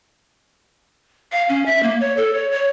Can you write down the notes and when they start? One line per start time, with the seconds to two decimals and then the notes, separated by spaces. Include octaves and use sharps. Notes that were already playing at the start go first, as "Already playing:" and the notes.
1.32 F5
1.49 C#4
1.66 E5
1.83 A#3
2.00 C#5
2.17 A4
2.33 C#5
2.51 C#5